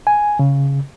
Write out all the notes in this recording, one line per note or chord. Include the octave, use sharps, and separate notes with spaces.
G#5
C#3